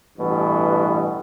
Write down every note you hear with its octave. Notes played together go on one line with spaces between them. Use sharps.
A1 G2 B2 E3